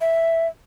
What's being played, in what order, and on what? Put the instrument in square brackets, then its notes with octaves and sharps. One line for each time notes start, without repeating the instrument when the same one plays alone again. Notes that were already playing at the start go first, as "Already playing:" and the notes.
[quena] E5